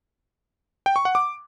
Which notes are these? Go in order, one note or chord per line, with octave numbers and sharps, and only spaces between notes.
G5
C#6
F#5
D6